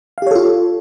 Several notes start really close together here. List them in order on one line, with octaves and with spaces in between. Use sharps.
F5 G4 C#5 A4 F4